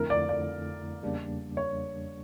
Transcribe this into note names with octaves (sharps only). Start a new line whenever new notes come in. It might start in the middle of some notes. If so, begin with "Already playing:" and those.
Already playing: F2 D3 A3 E4 A#4
D5
D5
E2 C#3 G3 A#3 D4
C#5